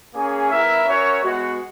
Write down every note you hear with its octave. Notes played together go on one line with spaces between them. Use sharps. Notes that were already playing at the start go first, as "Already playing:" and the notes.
A#3 C#4 G#4
B3 E4 A#4 E5
C#4 F#4 A#4 C#5 E5
G#3 B3 F#4